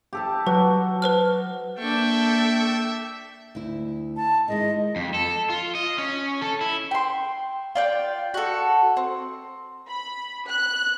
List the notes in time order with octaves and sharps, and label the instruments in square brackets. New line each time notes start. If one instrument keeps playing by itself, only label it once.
[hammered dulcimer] G4 A4 A5
[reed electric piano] F#3 [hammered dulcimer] F#4 [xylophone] B4
[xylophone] B4 C5 F6
[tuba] A#3 [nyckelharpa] D4 C#6 [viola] A4 G5 [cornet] E5
[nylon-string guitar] D2 E4
[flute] A5
[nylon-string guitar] D#3 G#3 E4 [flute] D#5
[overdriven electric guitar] F2
A4
F4
D#5
C#4
A4
E4
[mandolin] G5 C6
F4 D5 G5
F#4 A4
C4
[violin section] B5
F#6